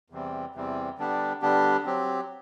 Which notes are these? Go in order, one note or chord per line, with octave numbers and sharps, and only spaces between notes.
E2 C3 E3 G3 C4
E2 C3 E3 G3 C4
D3 G3 B3 D4 G4
D3 G3 B3 D4 G4
F#3 C4 G4